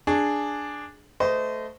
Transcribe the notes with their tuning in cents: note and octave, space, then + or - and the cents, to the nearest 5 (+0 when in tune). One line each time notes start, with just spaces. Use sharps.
D4 +0 G#4 +0
A3 +0 C5 -30 D#5 +0